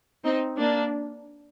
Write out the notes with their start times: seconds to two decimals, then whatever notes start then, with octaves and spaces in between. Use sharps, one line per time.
0.24 C4 D#4
0.58 A#3 D4